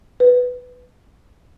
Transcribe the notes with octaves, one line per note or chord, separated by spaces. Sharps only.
B4